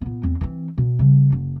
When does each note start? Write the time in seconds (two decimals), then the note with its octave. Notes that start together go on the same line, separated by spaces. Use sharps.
0.01 A#2 B3
0.23 E2 C4
0.41 E3 C4
0.78 B2
0.99 C#3 G3
1.32 F#1